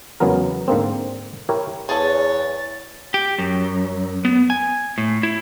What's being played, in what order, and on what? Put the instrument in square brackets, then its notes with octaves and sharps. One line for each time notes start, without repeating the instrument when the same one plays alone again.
[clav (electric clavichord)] E2 C#3 F#3 G#3 B3 A#4
G#2 D3 A#3 C4
E4 G4 A#4 C#5
[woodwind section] E2 [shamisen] G#4 A4 [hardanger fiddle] C#5 [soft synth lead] A6
[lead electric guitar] G4
F#2
B3
G#5
A2
E4